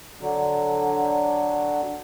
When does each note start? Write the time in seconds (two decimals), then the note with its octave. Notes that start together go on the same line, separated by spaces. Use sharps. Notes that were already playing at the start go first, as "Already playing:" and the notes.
0.21 D3 F#3